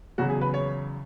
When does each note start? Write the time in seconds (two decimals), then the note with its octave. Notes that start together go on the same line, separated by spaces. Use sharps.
0.18 E2 C#3 F#3 F#4
0.30 G#4
0.41 B4
0.54 C#5